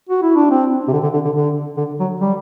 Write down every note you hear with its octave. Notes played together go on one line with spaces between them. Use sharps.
F#4
E4
D4
C4
C3
D3
D3
D3
D3
D3
D3
F#3
G3